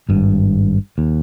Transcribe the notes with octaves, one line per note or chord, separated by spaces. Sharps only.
G#1 G2
D#2